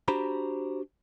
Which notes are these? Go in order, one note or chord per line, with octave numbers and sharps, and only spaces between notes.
D4 F#4 G4 C5 A#5 B5